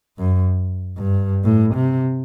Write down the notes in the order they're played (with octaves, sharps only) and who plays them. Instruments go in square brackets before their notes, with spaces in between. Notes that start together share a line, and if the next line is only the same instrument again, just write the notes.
[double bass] F#2
G2
A2
C3